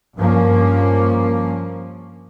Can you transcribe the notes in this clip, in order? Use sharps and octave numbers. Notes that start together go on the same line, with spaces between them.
G2 F3 A#3 C#4